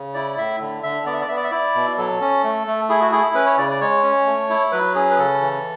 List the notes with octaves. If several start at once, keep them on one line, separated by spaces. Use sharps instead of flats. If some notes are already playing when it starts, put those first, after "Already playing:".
Already playing: C#3
E4 D5
A2 E5
D3
D3 E5
B3 D5
E5
D5
B3 E5
D5
E5
E4 D5
B2
F#3 A4
C#4
A3
A3
E4 G#4
F#4
E4 G#4
C#4 B4
C#5
C#3 D5
D5
G#3 C#5
C#4
A3
E4
F#3 B4
C#4 G#4
B4
C#3 A4
E3